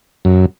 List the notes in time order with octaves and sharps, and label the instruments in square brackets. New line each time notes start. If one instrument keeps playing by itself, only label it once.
[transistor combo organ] F#2